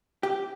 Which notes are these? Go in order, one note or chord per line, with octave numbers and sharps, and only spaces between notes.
G4